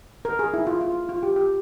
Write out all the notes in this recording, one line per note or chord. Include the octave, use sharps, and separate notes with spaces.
A#4
G#4
E4
F4
F4
F4
G4
G4